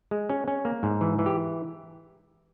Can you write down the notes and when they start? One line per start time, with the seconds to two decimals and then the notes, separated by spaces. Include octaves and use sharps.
0.11 G#3
0.30 C#4
0.48 C#4
0.65 A#3
0.83 G#2
1.01 E3
1.19 E3
1.26 G4